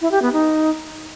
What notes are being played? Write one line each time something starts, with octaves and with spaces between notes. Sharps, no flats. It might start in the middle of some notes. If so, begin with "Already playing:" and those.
E4
G4
B3
D#4